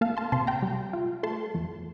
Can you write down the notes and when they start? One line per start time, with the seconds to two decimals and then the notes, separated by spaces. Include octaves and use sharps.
0.01 A#3 F5 A5
0.17 A5 C6
0.32 C3 A5 C6
0.47 G5 A#5
0.62 G3
0.93 F4
1.23 A3 A5 C6
1.54 F2